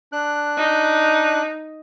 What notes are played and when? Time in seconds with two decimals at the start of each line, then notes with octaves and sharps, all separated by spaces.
0.12 D4 F#6
0.58 D#4